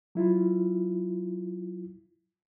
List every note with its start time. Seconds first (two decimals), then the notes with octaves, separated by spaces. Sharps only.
0.15 F#3 E4 F4